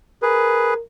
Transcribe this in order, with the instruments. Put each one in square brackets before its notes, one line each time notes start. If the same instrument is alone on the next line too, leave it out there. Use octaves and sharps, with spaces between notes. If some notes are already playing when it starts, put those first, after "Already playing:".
[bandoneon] G#4 B4 [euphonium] A#4